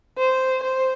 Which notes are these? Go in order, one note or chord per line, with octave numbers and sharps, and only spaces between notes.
C5
C5